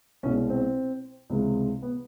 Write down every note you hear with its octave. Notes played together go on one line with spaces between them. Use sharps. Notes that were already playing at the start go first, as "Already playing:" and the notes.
C2 B2 G#3 C#4
C4
C#2 C3 E3 G#3
B3